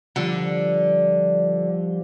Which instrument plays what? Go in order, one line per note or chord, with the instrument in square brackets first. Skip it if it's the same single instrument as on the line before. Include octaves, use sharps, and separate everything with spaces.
[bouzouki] D3 [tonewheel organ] F3 G3